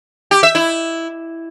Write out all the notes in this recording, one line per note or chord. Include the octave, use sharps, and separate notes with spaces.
G4
E5
E4